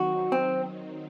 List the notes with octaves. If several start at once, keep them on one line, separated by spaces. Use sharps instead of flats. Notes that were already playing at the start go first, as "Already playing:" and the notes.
Already playing: D#3 F#3 C4 D#4 F#4
C4